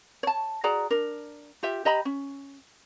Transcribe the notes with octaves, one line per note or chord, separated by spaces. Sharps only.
C#5 A5
F#4 G#4 D5 A#5
D4 A#4
F4 G4 E5
G4 D#5 A#5 B5
C#4